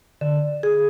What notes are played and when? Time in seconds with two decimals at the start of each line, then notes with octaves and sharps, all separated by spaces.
0.21 D3
0.63 G#4